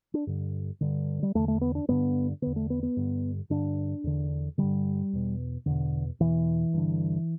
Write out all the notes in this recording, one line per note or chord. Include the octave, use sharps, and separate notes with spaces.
D4
G2 D3
G2 D3
G3
E2 D3 A3
A3
B3
D4
G2 D3 B3
E2 D3 B3
A3
B3
B3
G2 D3
G2 D3 D4
E2 D3
G2 D3 G3
E2 B2
E2 B2 D3
E2 B2 E3
G2 D3